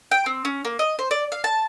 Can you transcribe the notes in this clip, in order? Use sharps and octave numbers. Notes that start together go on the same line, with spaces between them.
G5
C4
C#4
A#3
D#5
C5
D5
F5
A5